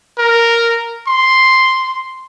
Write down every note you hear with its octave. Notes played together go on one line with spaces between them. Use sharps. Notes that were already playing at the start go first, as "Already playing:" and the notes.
A#4
C6